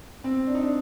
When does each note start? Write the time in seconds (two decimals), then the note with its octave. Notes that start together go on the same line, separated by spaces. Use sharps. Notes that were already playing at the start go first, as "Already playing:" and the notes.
0.24 C4
0.47 D4
0.55 D#4
0.62 D4